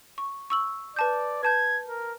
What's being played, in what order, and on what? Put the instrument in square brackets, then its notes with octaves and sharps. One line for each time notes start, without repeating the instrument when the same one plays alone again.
[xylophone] C#6
C#6 E6 F#7
[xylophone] B4 A5 G6 [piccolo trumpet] D5
[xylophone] B4 A5 G6 [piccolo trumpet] G#6
[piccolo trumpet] A#4